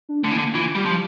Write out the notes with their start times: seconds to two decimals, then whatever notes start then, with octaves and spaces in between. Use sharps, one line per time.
0.09 D4
0.23 D3 A3
0.31 E3 A#3
0.38 D3
0.55 E3 F4
0.75 G3 G4
0.86 F3